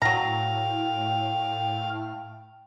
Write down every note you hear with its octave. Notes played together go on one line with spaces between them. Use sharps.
A2 F#3 F5 G5 A#5